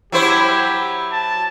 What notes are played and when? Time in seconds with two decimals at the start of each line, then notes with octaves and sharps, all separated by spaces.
0.12 F#3 E4 G4 C5
1.13 A5